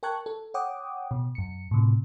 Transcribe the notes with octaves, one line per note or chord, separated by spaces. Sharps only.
A#4 G5 A5 C#6 F#6 G#6
A4
C#5 F#5 G5 D6 D#6
B2
F#2 C#7
A2 C3